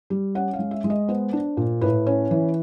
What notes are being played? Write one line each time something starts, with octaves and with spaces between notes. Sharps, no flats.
G3
C#4 F#5
F5
G#3
E5
G#3
D#5
B3 C5
D4
A#2
A2 B4
C#4
E3